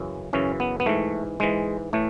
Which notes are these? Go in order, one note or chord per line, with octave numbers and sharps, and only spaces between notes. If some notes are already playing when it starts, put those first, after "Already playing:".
Already playing: F#2 C#3 E3
F#2 C#3 E3 C#4
B3
B3
G#2 E3 A3
G#2 E3 G#3
A2 E3 A3